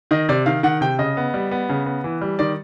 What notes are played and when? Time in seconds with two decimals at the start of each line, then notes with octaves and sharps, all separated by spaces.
0.11 D#3 D#5
0.29 C3 D5
0.46 D#3 F5
0.63 D#3 F#5
0.81 C3 G5
0.98 C#3 D#5
1.17 B3
1.34 G3
1.51 B3
1.69 C#3
1.86 B3
2.04 E3
2.21 G3
2.39 D#3 D5